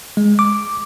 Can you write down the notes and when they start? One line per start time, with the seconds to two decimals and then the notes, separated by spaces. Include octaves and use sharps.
0.17 G#3
0.39 D6